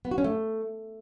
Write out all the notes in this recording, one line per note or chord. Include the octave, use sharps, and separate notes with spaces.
B3
F#4
C#4
A3